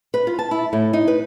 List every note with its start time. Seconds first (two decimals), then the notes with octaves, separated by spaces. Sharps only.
0.14 B4
0.27 F4
0.39 A5
0.51 E4
0.73 A2
0.93 D#4
1.08 B4